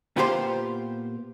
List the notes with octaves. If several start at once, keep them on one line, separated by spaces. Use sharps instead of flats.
A#2 B3 F4 G4 G#4 C5